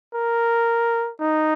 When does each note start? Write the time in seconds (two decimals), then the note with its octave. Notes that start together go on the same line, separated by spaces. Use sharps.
0.14 A#4
1.21 D#4